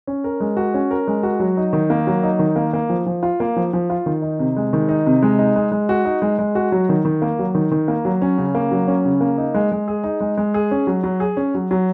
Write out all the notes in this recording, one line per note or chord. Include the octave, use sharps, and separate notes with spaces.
C#4
A#4
G#3
F#4
C#4
A#4
G#3
F#4
F#3
D#4
D#3
A#3
F#3
D#4
D#3
A#3
A#3
F3
F3
F4
A#3
F3
F3
F4
D#3
D#4
C3
G#3
D#3
D#4
C3
G#3
D#4
G#3
G#3
F#4
D#4
G#3
G#3
F#4
F#3
D#3
D#3
A#3
F#3
D#3
D#3
A#3
F#3
C#4
C#3
A#3
F#3
C#4
C#3
A#3
D#4
G#3
G#3
G#4
D#4
G#3
G#3
G#4
C#4
F#3
F#3
G#4
C#4
F#3
F#3